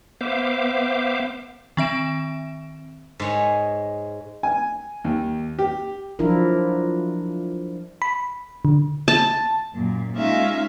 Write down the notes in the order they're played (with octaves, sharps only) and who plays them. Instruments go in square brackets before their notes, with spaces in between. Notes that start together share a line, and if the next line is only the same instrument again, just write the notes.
[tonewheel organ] B3 C5 E5 F5 D6
[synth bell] D#3 C4 E5 D7 E7
[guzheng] G#2 G#3 C#5
[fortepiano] G#5
D#2
G4
[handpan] F3 F#3 D4 E4 F4 A#4
[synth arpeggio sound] B5
D3
[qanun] A5
[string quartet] F#2 A#2
G#3 C#4 D#4 F4 E5 F5